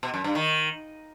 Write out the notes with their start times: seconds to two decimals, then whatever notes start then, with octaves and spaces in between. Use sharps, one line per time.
0.03 B2
0.14 F#2
0.24 G2
0.35 D#3